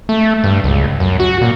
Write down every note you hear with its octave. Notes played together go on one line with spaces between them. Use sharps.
A3
G2
C#2
F#2
F#4
A#2